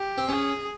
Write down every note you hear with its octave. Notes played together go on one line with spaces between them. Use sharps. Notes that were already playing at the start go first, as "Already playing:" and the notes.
Already playing: G4
C4
C#4 G#4